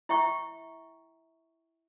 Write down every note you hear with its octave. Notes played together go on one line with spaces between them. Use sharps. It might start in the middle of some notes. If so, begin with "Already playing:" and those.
E4 E5 G5 C#6